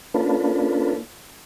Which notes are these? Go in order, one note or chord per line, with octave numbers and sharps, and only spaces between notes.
A#3 C#4 D4 F4 A4 B4